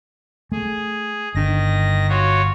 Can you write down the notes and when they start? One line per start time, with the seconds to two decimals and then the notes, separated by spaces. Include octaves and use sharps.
0.52 A3 G#4
1.35 G1 D#3 D4 A#6
2.09 F4 F#4 C#5